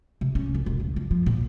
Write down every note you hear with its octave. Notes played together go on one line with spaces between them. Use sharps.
C3
C#4
C2
E1
C#2
F3
F3
A#2